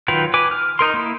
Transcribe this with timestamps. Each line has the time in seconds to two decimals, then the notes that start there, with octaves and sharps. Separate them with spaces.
0.08 D#3 F#3 F4 B4 G5
0.34 B4 G#5 D6
0.51 F6
0.79 D#4 A#4 C6
0.94 A#3 E4